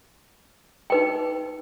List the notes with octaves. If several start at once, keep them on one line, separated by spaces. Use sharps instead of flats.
D#4 B4 G5